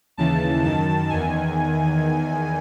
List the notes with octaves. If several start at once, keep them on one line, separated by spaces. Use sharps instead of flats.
D#2 C#3 E3 A5
F#2 D#3 A5
E2 D#3 G#5